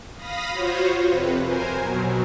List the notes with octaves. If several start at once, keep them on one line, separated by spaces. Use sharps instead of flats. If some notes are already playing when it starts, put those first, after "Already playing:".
F5 B5 D#6 A#6
F4 F#4 C5 C#5
F2 C3 B4
A#4 C5 G#5
B2 F#3